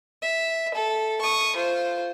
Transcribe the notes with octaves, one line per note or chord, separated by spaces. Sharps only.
E5
A4
C#6 D#6
F4 C5